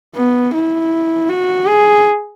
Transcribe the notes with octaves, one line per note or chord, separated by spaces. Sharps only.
B3
E4
F#4
G#4